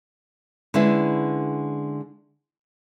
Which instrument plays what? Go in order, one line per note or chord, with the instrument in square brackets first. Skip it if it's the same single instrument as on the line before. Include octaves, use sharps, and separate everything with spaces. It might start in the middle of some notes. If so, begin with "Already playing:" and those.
[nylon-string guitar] D3 G#3 C#4 E4 B4